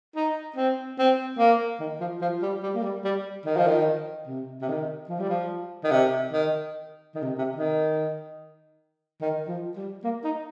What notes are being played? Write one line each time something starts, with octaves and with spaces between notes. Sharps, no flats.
D#4
C4
C4
A#3
D#3
F3
F3
G3
G3
A#3
G3
G3
D#3
F3
D#3
C3
C3
D#3
F3
G3
F3
D#3
C3
D#3
D#3
C3
C3
D#3
D#3
F3
G3
A#3
D#4